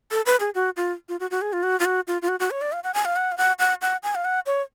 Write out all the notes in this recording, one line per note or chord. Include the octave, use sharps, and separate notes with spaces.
A4
B4
G#4
F#4
F4
F4
F#4
F#4
G#4
F4
F#4
F4
F#4
F4
F4
F#4
F#4
C#5
D5
F5
F#5
G#5
F5
F#5
F5
F#5
F#5
F#5
G#5
F5
F#5
C#5